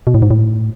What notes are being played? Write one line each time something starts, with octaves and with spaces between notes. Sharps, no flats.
B2
A2
G#2
A2